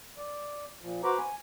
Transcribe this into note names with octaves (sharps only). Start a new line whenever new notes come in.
D5
A#2 F3
F#4 B4 C5 A#5 B5 D6
G#5